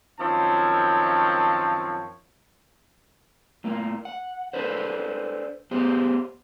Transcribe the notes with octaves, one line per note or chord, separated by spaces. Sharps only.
F#2 D#3 F3 C4 C#5 A5
A2 A#3
F#5
D4 A4 B4 C5
B3 G4 G#4 C5